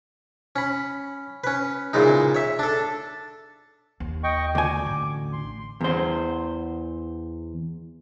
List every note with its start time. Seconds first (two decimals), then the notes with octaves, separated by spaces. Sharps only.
0.56 C#4 B5
1.44 C#4 B4
1.93 A#2 C#3 E3 G#3 D#4
2.35 C#5 E5
2.59 D4 A4
4.00 D#2
4.24 D#5 G5 C#6
4.55 D2 G#5 D6
4.86 A1
5.33 C6
5.81 E2 C5